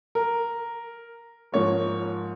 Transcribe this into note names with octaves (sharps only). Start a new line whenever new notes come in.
A#4
G#2 F3 A#3 C#5